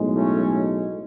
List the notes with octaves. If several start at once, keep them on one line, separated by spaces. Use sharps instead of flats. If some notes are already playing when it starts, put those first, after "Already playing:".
Already playing: B1 A2 G#3
A3 C#4